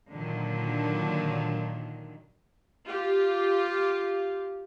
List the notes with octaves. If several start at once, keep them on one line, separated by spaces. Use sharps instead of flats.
A#2 D3 D#3 F#3
F4 G4